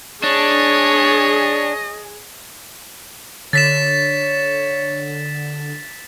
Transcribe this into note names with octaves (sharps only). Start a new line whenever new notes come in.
D4 G#4 C#5 D#5 G#5
D3 C#5 A6 B6 E7